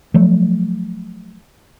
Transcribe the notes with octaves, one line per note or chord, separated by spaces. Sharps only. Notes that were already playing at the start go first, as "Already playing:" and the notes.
F3 F#3 A3